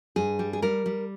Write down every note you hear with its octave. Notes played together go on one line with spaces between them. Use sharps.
G2 G#4
G3
G#4
G3 A#4
G3